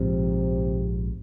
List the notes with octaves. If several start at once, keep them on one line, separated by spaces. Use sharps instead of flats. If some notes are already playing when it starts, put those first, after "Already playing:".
Already playing: A#1 G#2 C3 F3